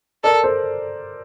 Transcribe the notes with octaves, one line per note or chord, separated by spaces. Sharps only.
A4 A#4 D5
A4 C5